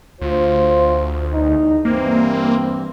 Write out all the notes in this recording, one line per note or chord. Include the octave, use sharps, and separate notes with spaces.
D2 F4 C5
E2 D#4
G2 E3 A#3 C4